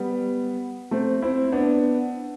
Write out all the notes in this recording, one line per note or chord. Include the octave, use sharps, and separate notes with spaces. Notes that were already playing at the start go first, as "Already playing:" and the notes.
Already playing: G3 B3
A3 C4
C4 E4
B3 D4